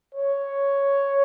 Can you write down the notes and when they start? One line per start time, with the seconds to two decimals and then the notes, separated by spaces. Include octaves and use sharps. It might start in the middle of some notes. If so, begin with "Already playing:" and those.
0.15 C#5